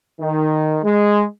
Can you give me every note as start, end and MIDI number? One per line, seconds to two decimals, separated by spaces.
0.20 0.78 51
0.84 1.23 56